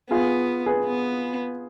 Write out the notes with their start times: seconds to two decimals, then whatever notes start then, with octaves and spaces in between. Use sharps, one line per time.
0.11 B3 F4 G#4
0.66 G#4 B4
0.85 B3